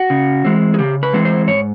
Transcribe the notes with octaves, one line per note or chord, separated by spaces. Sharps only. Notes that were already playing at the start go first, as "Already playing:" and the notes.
Already playing: F#4
C#3
E3 G#3 C4
G#4
C#3 G4
B4
E3 G#3 C4
C5
G#2 C#5